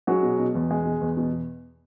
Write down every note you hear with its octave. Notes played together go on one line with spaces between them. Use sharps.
F#3 G#3 F#4
B2
B2
E2
G#3
B2
E2
B2